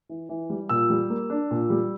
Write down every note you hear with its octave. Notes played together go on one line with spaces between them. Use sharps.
E3
E3
G3
A#2 E6
G3
A#3
D4
A#2
G3